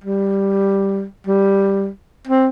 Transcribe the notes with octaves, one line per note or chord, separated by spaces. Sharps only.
G3
G3
C4